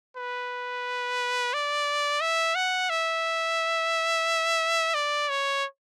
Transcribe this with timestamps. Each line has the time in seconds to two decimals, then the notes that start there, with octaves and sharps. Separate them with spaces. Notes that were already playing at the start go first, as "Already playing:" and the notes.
0.17 B4
1.54 D5
2.21 E5
2.55 F#5
2.90 E5
4.95 D5
5.29 C#5